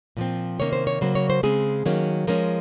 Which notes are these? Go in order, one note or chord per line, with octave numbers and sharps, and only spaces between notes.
A#2 F3 C4
C3 D#3 A#3 C#4 C#5
C5
C#5
C#3 F#3 A#3 C5
C#5
C5
C#3 G#3 C4 G#4
D#3 F#3 A#3 C#4
F3 G#3 C#4 A#4